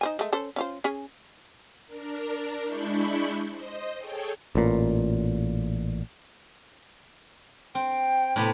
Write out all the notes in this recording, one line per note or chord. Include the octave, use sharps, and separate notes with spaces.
D#4 C5 G#5
G#3 A3
C#4 A4 C5
C#4 F4 C5
C#4 G#4
D4 A#4
G#3 D4 E4 B5 C#6 G6
C5 D#5
G#4 A4 C#5 G5
A1 A#2
C4 G5
A2 C3 B3